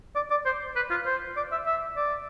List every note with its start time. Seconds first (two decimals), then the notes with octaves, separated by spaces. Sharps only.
0.15 D5
0.30 D5
0.46 C5
0.76 B4
0.91 F4
1.06 C5
1.37 D5
1.52 E5
1.66 E5
1.97 D5